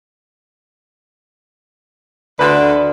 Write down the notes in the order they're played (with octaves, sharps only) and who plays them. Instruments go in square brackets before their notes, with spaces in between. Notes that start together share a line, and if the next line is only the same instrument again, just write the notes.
[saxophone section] D2 D3 [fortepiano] B4 B5 C6